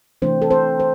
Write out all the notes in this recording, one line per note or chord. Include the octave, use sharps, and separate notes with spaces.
C3 E3 A3 C4 D4 C5
A4
C4 C5
C5